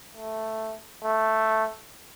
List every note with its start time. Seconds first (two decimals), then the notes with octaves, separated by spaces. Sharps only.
0.15 A3
1.03 A3